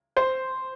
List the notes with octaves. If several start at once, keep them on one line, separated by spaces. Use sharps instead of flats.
C5